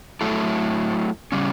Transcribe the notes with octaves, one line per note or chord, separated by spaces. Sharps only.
F#3 A3 E4 A4
C#3 G3 C#4